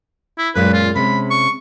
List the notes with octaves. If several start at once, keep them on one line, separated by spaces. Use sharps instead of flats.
E4
F#2 A#2 G#3 B4
F4
C3 G#3 C#4 B5
C#6